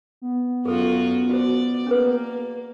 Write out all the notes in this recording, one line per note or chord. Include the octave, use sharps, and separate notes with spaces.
B3
F#2 F4 F#4 G#4 A4
F#4 C5 D5
A#3 C#4 G#4 B4